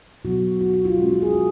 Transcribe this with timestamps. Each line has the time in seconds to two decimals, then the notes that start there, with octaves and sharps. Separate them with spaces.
0.25 B2 F#3 B3 F#4
0.61 F#4
0.74 F#4
0.85 F4
0.97 B2 G#3 C#4 F#4
1.09 F#4
1.22 G#4
1.34 F#4